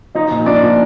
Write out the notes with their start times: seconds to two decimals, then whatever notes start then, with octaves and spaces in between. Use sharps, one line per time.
0.15 F3 D#4 D#5
0.31 A#2
0.46 F3 D4 D5
0.63 A#2